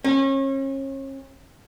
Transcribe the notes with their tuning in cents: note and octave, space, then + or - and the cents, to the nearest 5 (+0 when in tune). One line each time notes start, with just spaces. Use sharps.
C#4 -35